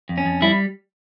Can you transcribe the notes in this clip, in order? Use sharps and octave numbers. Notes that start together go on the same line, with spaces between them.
F2
C#4
F2
G3 E4